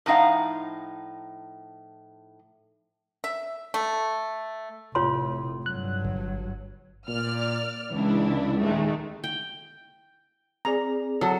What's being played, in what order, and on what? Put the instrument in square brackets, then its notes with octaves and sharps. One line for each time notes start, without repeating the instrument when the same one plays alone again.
[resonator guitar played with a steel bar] A2 F3 D#4 F5 F#5
[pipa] E5
A3
[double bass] F1 A2 [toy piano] F4 C#5 C6
[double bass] G2 F#3 [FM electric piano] F#6
[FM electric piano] G1
[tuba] A#2 [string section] D5 F6
[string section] C#2 D4 E4 [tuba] E3
[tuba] D#1 [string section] D#3 G#3 A3
[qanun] G5
[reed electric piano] C4 G#4 D5 [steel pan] A#5
[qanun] F#3 [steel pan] A4